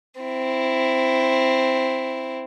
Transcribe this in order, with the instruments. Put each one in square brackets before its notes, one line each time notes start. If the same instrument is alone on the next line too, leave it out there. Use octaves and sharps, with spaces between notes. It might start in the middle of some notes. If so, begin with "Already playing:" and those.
[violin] C4 E4